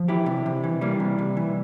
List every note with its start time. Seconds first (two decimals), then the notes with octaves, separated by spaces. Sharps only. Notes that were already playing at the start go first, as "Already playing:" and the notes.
Already playing: F3
0.08 E3 E4 G4
0.26 C3
0.46 C3
0.64 E3
0.81 E3 G3 A#3
1.00 C3
1.18 C3
1.37 E3